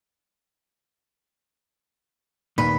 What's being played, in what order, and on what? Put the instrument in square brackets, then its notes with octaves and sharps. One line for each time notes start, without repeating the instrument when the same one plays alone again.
[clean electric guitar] D#2 A#2 D#3 [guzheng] B4